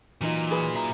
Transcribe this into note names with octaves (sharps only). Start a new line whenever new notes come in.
A#2 E3 F#3 D#4 F4
G#4 B4
E5 A#5